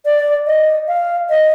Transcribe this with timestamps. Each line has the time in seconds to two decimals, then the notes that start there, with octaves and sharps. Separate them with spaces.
0.05 D5
0.47 D#5
0.88 F5
1.30 D#5